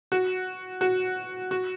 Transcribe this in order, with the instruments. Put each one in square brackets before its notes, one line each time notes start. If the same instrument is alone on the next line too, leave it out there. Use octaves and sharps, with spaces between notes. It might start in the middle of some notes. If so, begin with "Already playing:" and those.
[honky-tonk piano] F#4
F#4
F#4